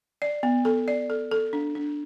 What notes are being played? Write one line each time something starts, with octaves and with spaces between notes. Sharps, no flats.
D5
B3
A4
D5
A4
A4
D4
D4